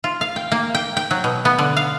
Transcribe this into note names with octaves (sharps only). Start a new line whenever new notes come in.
F4
F5
G5
A#3
G5
G5
F#3
B2
B3
D3
F5